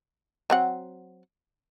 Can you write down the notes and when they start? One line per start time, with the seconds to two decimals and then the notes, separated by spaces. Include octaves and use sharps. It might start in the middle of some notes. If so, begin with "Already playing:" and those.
0.50 F#3 C4 F#5